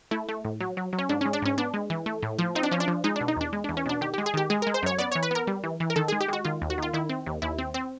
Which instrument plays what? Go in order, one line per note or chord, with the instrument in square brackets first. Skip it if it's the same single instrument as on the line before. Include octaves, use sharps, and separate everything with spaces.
[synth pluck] A3 E4
A3
A2
F#3
F#3
F#3
C#4
G#2 D4
G#3 C#4
D4
G#2 C#4
B3 D4
G#3
E3
A3
A2
F3
C4 D#4
D4
F3 C#4
D4
F3
G#3 D#4
B2 D4
D#4
E2 D4
G#3
E2 D4
C#4
B2 D4
D#3 G4
G#3 G4
G#4
D#3 G4
G#3 G#4
G#3 A#4
C5
F#2 C#5
B3 D5
E3 C#5
B4
B3 A#4
G3
E3
E3
A#4
D#3 A4
G#3 G#4
G4
G#3 F#4
D#3 F4
D#2
F#4
D#3 F4
D#3 E4
C4
D#2
D#2 E4
C4
C4